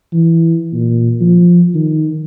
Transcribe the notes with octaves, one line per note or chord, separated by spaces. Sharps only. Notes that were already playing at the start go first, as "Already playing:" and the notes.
E3
A#2
F3
D#3